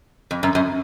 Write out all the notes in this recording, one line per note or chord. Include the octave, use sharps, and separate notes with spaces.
F2
F#2
F#2